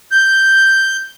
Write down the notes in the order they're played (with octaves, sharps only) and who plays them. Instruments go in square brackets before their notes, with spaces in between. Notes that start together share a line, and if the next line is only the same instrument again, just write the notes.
[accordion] G6